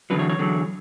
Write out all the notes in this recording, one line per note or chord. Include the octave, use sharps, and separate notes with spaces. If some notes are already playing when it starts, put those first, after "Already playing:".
E2 D3 F#3 B4
C#5
C#5
E2 D3 F#3